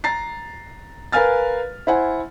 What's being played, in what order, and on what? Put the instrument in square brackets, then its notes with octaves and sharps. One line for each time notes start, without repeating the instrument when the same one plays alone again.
[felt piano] A#5 A6 C7
A#4 B4 F5 G#5 F6 A6
E4 C5 F#5 G#5